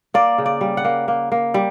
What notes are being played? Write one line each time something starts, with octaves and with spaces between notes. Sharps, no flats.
A#3 D5
C#3
D5
G3
F#5
A#3
A#3
A#3
G3